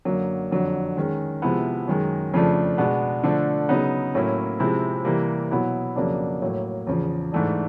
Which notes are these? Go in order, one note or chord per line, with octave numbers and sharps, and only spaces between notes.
F#2 D3 F#3 A#3
F2 D3 F#3
D#3 G#3 C#4
C3 F3 G#3 B3 E4
F#2 D#3 G#3
F2 C#3 F3 A3 D4
B2 G#3 B3 D4
D3 F3 A3 D4
C#3 F#3 B3 D#4
A2 F#3 A#3 C#4 E4
C3 F3 G#3 C4 E4
C3 E3 G3 A#3
B2 F#3 B3 E4
F2 C#3 F#3 A#3 D4
A2 F#3 A#3
E2 C#3 F3
G#2 E3 A3 D4